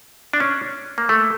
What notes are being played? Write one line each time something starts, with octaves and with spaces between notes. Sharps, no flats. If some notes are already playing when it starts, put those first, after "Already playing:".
D4
C#4
A#3
A3